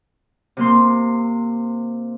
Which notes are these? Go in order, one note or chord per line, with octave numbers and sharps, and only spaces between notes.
C3 A#3 C6